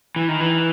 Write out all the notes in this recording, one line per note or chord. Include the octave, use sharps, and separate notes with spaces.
E3
D#3
E3